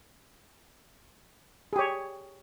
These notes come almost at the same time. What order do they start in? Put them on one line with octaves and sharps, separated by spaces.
G#4 G4 C#5